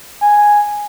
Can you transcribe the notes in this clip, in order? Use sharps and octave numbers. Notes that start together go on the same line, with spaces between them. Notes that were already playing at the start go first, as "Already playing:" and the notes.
G#5